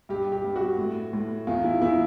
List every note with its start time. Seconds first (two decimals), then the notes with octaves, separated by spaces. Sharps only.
0.09 G2 G4
0.32 G4
0.44 G2
0.56 F#4
0.78 A2
1.13 A2
1.47 E2 F4
1.64 E4
1.81 E2 E4